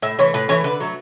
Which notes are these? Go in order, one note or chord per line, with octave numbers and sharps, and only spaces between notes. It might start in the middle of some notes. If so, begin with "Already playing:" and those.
A2 E5
E3 A3 C#5
A2 B4
E3 A3 C#5
D3 B4
F#3 A3